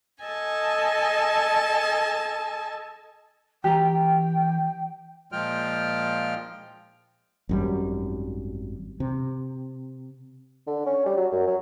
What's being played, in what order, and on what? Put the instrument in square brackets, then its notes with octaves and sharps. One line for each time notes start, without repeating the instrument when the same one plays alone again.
[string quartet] A4 D#5 G#5 A5
[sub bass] E3 [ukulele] G4 A#5 [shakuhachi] G5
[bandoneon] A#2 F3 G#3 F4 G5 F6
[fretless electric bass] G#1 F#2 G3
C3
[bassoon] D3
C#4
G3
F#3
F#2
F#3